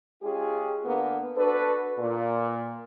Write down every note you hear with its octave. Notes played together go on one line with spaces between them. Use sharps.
G#3 C#4 F4 G4 G#4
D3 A#3 B3
D4 F#4 A4 B4
A#2